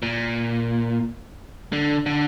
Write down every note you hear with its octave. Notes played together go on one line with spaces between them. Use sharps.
A#2
D3
D3